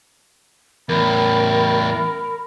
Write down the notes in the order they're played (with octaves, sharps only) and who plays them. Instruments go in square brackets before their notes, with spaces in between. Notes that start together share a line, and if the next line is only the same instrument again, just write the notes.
[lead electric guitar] E2 A2 [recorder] A#4 [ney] B5